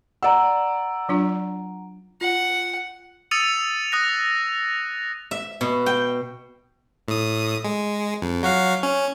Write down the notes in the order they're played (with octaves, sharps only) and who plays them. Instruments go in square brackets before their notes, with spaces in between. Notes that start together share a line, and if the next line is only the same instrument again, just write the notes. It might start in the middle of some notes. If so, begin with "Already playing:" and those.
[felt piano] D5 E6 [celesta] F#5 A#5
[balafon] F#3 D4 F4
[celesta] F4 [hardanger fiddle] F#5
[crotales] D#6 E6 A6 C#7 D#7 F7
D#6 F#6 A#6
[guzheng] E5
B2
G5
[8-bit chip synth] A2 D#6
G#3
F2
F#3 F#4 F5
C#4